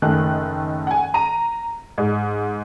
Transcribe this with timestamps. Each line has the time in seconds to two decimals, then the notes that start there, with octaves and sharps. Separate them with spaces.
0.02 F#1 D#3 A3 F#6
0.87 F#5 G#5
1.14 A#5 D#7
1.98 G#2